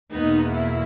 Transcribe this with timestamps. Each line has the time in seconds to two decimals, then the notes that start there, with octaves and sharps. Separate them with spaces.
0.13 E2 B2 A#3 B3 D#4
0.55 E4